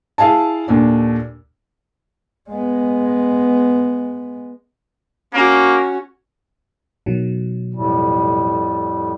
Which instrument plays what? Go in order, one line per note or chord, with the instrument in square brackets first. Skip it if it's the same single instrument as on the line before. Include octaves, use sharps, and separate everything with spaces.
[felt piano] E4 G#4 F5 G#5 A5
D#2 A#2 D3 D4
[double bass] G#3 B3
[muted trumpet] A#3 [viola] C#4 F#4
[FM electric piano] B2 D#3 F#3
[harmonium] F2 A2 G3